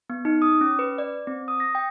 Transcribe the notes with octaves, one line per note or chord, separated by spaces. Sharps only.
B3
D#4
D#6
C#4
B4
D5
C4
D#6
A#6
G5